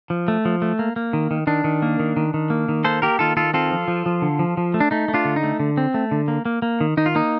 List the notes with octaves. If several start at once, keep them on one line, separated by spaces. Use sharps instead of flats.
F3
A3
F3
A3
A#3
A#3
D#3
D#3
D#3 D4
D#3
A#3
D#3
D#3
D#3
A#3
D#3
A#3 A4 C5
A#3 G4 A#4
D#3 F4 A4
D#3 F4 A4
C4 F4 A4
F3
F3
F3
D3
F3
F3
A3
D4
A3 D#4
A3
D4 F4
D3
D#4
A3
D3
C4
A3
D3
A#3
A#3
A#3
D#3
D#3 D#4
F4
A#3 D#4